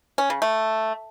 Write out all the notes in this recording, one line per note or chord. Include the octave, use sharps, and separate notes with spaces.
C#4
C#3
A3